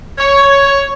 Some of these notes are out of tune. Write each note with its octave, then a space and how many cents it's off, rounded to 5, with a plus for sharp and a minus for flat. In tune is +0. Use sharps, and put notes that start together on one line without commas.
C#5 +5